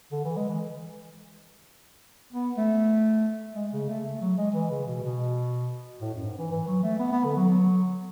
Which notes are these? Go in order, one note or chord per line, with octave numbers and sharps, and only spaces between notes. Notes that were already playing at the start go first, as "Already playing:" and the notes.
D3
E3
G#3
E3
B3
A3
G#3
C#3
A3
A3
F#3
G#3
E3
C#3
B2
B2
A2
F#2
G#2
E3
E3
F#3
A3
B3
B3
D3
F#3
F#3